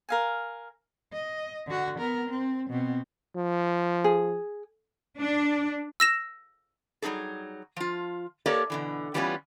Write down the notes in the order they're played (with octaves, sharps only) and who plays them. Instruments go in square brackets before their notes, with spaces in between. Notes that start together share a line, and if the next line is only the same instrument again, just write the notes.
[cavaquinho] A#4 F5 G#5
[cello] D#5
D3 F#4
B3 A#4
C4
B2 C4
[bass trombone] F3
[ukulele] G#4
[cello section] D4
[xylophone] E6 A#6 E7
[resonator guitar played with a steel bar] F#3 G3 D#4 G#4 A4
F3 F4
A#3 G4 A4 A#4 C#5 D5
B2 D3 E3
E3 G3 B3 C#4 F4 B4